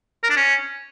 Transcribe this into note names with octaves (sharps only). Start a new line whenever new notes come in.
A#4
D4
C#4